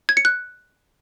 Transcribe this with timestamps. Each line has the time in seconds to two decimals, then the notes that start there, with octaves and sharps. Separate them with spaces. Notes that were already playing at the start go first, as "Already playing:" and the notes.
0.09 G#6
0.17 C#7
0.25 F#6